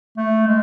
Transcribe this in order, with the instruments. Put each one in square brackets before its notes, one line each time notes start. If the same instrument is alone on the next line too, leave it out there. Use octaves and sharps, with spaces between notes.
[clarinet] A3
G#3